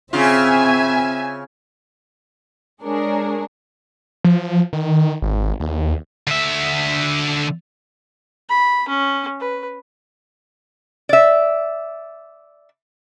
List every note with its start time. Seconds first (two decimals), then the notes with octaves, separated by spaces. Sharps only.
0.13 C#3 C4 F4 E5 G#5
2.82 G#3 D4 G#4 A#4 C#5
4.24 F3
4.73 D#3
5.22 G#1
5.60 D#2
6.27 D3 E5
8.49 B5
8.89 C#4
9.40 B4
11.09 D5 E5